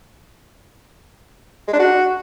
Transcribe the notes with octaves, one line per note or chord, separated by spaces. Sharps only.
G#3
D4
F#4